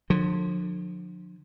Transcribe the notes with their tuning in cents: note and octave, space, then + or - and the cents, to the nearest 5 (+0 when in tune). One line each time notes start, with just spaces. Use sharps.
D3 +30 F3 +40